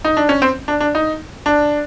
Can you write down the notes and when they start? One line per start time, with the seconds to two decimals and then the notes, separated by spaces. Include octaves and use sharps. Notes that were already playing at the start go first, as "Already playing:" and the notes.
0.05 D#4
0.17 D4
0.29 C#4
0.42 C4
0.68 D4
0.80 D4
0.95 D#4
1.46 D4